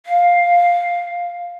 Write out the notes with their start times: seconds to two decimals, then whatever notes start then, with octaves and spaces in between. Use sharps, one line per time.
0.06 F5